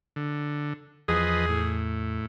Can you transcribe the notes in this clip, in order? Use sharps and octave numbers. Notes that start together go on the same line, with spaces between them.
D3
E2 F3 G#4 B4 D#5
A2